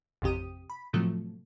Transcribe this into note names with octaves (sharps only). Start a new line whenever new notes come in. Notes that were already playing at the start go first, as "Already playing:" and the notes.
A1 F2 C3 G4 D#6
B5
A2 C3 F3 F#3 A3